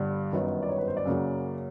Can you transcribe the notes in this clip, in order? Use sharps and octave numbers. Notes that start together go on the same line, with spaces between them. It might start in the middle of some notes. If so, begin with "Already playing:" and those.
Already playing: G1 G2 D3 G3 D5
G1 F#2 D#3 F#3 B3
D5
C#5
B4
C5
D5
F#2 C#3 F#3 A#3